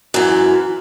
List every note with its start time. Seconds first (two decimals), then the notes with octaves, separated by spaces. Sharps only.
0.14 F#2 E3